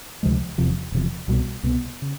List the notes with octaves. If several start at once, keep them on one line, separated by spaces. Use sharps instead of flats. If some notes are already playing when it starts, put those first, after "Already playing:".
D2 C3 F3 G#3
E1 E2 C3 F3
E1 E2 C3 F3
C2 B2 G3 B3
C2 B2 G3 B3
C#3